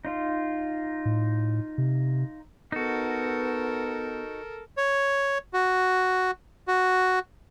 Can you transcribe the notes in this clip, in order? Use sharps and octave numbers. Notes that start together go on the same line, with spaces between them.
D#4 F4
A2
C3
B3 D#4 F#4 A4 A#4
C#5
F#4
F#4